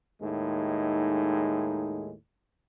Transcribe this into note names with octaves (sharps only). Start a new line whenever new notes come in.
D#2 A2 G#3 D#4